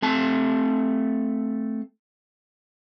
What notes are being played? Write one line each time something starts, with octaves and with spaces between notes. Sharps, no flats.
A3 C4 A5